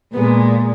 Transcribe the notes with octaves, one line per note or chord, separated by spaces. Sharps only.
A#2 G#3 B3